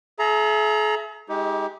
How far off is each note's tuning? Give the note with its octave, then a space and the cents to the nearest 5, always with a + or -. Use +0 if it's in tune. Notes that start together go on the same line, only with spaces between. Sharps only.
G#4 +45 E5 +15 A#5 +0
G#3 +0 D#4 +35 G4 +0